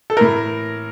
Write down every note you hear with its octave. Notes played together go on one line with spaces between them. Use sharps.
A4
A2 E3 A#4